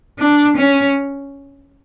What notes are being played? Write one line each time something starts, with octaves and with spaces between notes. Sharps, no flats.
D4
C#4